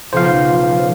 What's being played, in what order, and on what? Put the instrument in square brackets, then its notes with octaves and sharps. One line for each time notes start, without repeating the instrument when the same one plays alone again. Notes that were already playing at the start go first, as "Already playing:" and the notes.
[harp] B1 C#3 G6 [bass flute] F3 [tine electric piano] C5 F5